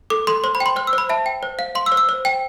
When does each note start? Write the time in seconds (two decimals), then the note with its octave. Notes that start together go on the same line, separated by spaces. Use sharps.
0.10 A4 D6
0.27 A4 C6
0.44 C5 C6
0.55 B5
0.60 G5
0.66 C6
0.76 C5 F6
0.87 E6
0.93 C5
0.98 B5
1.09 E5 A5
1.26 G5
1.43 C5
1.59 F5
1.75 F5 C6
1.86 E6
1.92 C5
1.97 E6
2.09 C5
2.25 G5